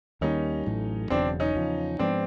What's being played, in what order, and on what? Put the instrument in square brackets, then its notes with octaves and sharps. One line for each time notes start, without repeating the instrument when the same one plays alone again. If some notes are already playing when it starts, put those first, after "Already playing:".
[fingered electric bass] D#2 D#3 G3 A#3 [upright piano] C#4 D#4
[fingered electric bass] A1 A2 F#3 A3
[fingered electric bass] E1 E2 C#3 F#3 [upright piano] C4 D4
[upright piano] C#4 D#4
[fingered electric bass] E2 C#3 F3
[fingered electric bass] G#2 F3 G#3 B3 [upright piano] C4 D4